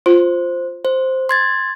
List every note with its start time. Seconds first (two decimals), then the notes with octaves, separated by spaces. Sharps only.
0.06 F4 C5
0.85 C5
1.29 C6 G#6 A6